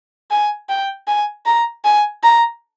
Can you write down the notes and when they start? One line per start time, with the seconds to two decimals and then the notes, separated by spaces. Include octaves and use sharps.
0.31 G#5
0.69 G5
1.07 G#5
1.46 A#5
1.85 G#5
2.23 A#5